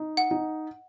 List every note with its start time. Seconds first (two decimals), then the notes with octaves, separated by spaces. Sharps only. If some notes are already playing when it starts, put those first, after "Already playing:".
Already playing: D#4
0.17 F#5
0.31 D#4